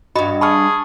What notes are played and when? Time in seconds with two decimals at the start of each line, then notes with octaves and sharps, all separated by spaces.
0.16 G2 F#4 D#5 B5
0.41 G#4 A5 B5 C#6 F6